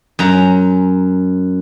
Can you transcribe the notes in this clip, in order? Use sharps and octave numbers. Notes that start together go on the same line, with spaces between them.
F#2 A#5